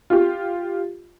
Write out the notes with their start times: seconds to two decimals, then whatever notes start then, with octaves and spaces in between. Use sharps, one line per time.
0.10 F4 G4